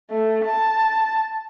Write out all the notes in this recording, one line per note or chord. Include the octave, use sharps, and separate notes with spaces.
A3
A5